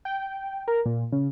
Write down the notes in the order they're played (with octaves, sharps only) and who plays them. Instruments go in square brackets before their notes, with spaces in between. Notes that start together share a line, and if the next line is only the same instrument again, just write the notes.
[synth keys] G5
A#4
A#2
C#3